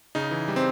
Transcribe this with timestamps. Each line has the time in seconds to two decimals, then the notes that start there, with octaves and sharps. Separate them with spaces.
0.15 C#3 D#4
0.31 E3
0.48 G3
0.56 C4